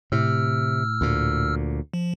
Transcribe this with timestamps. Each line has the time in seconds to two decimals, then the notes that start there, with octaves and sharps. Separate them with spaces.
0.12 A2 C3 E6 F6
1.01 D2 A#2
1.94 F3